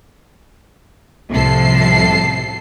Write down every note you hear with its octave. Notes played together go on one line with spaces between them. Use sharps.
C2 A2 C3 F3 A4 C7